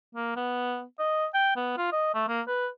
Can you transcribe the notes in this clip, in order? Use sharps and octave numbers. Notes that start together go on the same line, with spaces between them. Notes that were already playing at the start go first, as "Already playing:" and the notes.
A#3
B3
D#5
G5
B3
F4
D#5
A3
A#3
B4